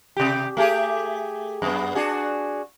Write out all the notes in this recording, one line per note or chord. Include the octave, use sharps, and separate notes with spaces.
C3 G4
A3 G4 G#4
F#2 B3
D4 F#4 G#4